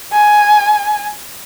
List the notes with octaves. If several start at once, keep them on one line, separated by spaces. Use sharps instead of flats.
G#5